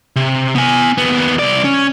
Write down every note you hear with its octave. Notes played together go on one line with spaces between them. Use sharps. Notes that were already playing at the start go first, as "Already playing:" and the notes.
C3
B3 G#5
D#2 B3
C2 D5
C#4